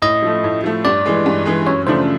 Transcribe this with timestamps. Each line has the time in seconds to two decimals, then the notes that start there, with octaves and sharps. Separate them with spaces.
0.02 A2 D#5
0.22 F3 A3
0.44 A2
0.64 F3 A3
0.85 G2 D5
1.05 E3 G#3
1.26 G2
1.46 E3 G#3
1.66 F#2 C#5
1.86 C#3 F3 A3 D4 C5